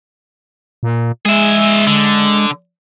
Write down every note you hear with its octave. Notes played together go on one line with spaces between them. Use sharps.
A#2
G#3 G#4 E5
D3